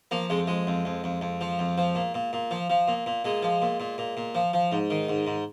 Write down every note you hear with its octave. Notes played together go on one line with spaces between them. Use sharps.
F3 A#3
F2 G#3
F2 G#3
F2
F2
F2
F2
F3
F2
F3
A#2
A#2
A#2
F3
F3
A#2
A#2
A#2 G#3
F3
A#2
A#2
A#2
A#2
F3
F3
G#2
D#3
G#2
G#2